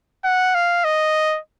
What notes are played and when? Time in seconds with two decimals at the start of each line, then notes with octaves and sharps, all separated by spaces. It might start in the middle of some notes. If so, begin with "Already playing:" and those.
0.25 F#5
0.55 F5
0.84 D#5